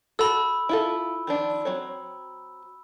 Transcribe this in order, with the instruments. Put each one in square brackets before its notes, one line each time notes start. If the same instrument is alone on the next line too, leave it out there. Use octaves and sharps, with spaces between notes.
[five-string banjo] F#4 A4 [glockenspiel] B5 E6
[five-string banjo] E4 F4 A4
D#3 F3 D4
F#3 C4 C#5